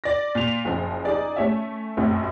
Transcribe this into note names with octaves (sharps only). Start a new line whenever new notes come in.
D5 A#6
A#2 F7
F#1 F3
D#4 G#4 D5
A3 C#4 E5
F1 A#1 F#2 A3